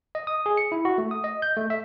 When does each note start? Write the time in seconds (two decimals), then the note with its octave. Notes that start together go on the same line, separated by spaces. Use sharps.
0.15 D#5
0.27 D#6
0.46 G#4
0.57 C#7
0.72 E4
0.85 F#4
0.98 A3
1.11 D#6
1.24 D#5
1.42 G6
1.57 A3
1.70 E5